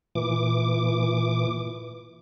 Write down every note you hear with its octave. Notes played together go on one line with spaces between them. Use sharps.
A#2 E3 D6